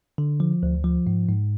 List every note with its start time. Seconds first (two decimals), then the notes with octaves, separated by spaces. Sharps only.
0.18 D3
0.40 F3
0.63 D2
0.84 F3
1.07 G#2
1.28 G#2